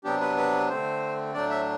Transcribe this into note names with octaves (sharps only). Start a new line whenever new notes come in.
C3 F#3 B3 D4 G4
B4
B4
D3 A3 C4 C5
A2 F#3 A3 D4 D5
E5